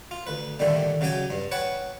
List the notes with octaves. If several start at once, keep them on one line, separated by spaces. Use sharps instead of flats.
F4
D2 B4
A#2 D3 D#3 G3 A3 D4
C#3 F#3 G4 G5 G#5
G2
B4 C#5 F#5 G5 A5